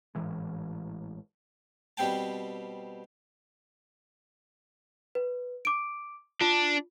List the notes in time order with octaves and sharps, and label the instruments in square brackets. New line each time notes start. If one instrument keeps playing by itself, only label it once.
[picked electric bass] A1 G#2 E3 G#3
[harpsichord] B2 G3 C4 G5 A5
[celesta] B4
D6 D7
[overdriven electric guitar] D4 [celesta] F4